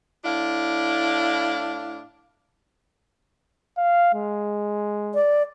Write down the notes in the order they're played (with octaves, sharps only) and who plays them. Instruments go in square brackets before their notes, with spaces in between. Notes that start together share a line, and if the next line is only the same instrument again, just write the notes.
[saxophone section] A2 D4 E4 F5
[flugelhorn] F5
G#3
[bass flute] D5